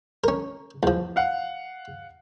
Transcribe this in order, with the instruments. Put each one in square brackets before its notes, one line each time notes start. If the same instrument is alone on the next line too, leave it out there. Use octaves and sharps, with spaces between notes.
[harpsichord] C#4 A#4
E2 F3
[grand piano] F5 F#5